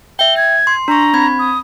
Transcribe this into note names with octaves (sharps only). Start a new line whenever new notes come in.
E5 G5 G7
G#6
C6
D4 A#5 C#6
C4 B5 G#6
D#6